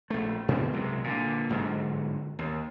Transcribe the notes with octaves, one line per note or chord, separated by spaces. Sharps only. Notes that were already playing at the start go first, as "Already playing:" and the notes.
A#1 A3
G2 B2 D3 G3
C2 C3 F#3 G#3
A#2 D3
G1 G#2 D3 F#3
D#2